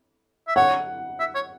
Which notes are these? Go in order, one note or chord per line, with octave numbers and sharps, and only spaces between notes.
E5
C#5 F#5
E5
C#5